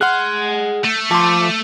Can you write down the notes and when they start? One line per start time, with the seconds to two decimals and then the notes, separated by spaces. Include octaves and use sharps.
0.01 G#4 F#5 C6 F6 F#6
0.84 A3
1.11 F3 A5 C6 D6